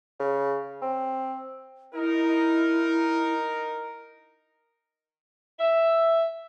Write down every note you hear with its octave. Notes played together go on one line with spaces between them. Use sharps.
C#3
C4
D#4 E4 A#4
E5